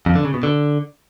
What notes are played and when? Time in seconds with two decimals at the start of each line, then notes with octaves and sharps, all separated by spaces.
0.06 F2
0.16 D3
0.25 C#3
0.34 B2
0.43 D3